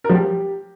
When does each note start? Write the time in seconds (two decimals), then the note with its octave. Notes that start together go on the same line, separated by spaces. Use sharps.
0.04 A#4
0.09 F3
0.14 G4